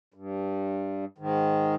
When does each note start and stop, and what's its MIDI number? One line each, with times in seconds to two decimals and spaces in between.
0.14 1.05 43
1.18 1.75 44
1.18 1.75 51